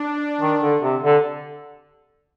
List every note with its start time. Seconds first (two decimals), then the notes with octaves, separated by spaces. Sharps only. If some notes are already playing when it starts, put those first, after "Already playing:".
Already playing: D4
0.40 D#3
0.61 D3
0.82 C3
1.03 D3